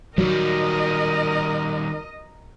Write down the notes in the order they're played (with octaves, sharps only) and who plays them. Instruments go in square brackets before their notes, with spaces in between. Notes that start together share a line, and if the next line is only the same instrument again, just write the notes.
[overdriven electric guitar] D#3 G3 [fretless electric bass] F#3 [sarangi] A#4 [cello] D#5